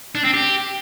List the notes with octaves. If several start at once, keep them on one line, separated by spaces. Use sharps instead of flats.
D4
C4
G4